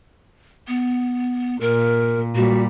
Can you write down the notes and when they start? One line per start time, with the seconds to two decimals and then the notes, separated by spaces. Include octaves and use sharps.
0.68 B3
1.61 A#2 A#4
2.35 A#2 G3 F#4